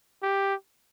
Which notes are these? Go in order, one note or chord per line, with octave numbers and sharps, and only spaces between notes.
G4